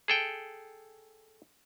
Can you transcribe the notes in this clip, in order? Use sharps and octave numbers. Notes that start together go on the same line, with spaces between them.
G#4 A4 G5